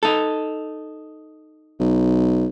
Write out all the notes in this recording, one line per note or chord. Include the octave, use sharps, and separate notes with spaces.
D#4 A4
B1